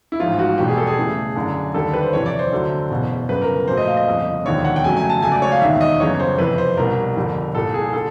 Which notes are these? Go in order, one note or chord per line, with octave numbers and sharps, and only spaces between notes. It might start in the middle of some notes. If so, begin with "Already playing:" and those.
E4
A1 G#2 F3 F4
F#4
E2 B2 G3 G4
G#4
A4
G#4
E2 C#3 E3 A3
F#1 F#2 D3
D#2 D3 G3 A4
B4
C5
F2 C3 E3 C#5
D5
C5
D2 D3 F#3 A3
F#1 E2 B2
G1 F#2 C#3 B4
A#4
A#1 A#2 F#3 A3 C5
D#5
F5
D#5
G1 F2 C#3
E1 D#2 D3 F3 C#5
F#5
G5
F2 C#3 F#3 A3 G#5
G#5
A5
C#2 C#3 F#3 A3 G#5
D5
C#5
F5
E1 D#2 D#3 E5
D#5
G1 F#2 C#3 E3 C#5
C5
F2 C3 E3 B4
C5
C2 B2 G3 A#4
G1 F2 D3 G3
C2 A#2 G3 A4
G#4
D3 A4